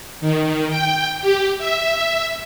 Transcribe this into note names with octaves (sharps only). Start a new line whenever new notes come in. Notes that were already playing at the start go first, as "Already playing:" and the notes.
D#3
G5
G4
E5